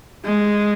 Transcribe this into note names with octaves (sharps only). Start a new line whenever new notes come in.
G#3